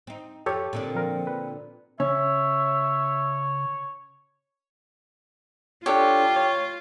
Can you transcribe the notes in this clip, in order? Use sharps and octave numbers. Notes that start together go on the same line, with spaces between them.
C4 D#4
F2 F3 G4 A4 C#5
A#2 D3 C4 D4
F3 A#4
B4
C#3 C#4 C#5 E5
D4 F4 G4 A4 C#5
C#5